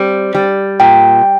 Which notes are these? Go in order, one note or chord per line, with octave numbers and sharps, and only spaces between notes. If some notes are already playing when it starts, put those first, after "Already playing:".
Already playing: G3 C4
G3
A#2 G5